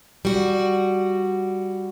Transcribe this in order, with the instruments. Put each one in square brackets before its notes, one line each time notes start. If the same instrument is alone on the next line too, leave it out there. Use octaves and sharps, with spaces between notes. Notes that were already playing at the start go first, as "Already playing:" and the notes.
[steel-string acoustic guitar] G3 F#4